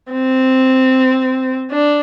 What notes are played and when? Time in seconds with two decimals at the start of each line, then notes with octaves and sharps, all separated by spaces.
0.12 C4
1.72 D4